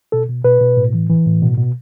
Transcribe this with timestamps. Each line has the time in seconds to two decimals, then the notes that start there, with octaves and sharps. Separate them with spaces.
0.12 B2 A4
0.29 B2
0.44 B2 B4
0.61 B2
0.77 A2
0.94 E3
1.09 E3
1.26 A2
1.42 B2
1.57 B2